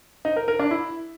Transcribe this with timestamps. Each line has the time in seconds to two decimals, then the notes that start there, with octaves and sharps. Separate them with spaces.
0.25 D#4
0.36 A#4
0.48 A#4
0.59 D4
0.71 E4